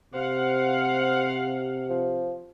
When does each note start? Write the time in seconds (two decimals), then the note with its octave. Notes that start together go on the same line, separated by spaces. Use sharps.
0.14 C3 C5 F5 F#5
1.89 F3